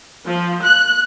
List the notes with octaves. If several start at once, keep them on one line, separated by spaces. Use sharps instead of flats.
F3
F#6